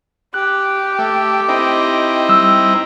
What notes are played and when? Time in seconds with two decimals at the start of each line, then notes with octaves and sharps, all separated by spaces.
0.34 G4 F#6
0.99 A3
1.49 C4 D#4 E4 D#5
2.29 G3 E6